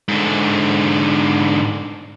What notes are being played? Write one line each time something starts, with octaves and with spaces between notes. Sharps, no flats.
G#2 D3